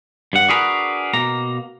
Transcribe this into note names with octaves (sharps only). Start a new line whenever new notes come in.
G2 F#5
D4 F#4 G#4 A#4 B4
B2 A#3 A#5